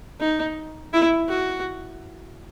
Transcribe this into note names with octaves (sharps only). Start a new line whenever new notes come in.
D#4
E4
F#4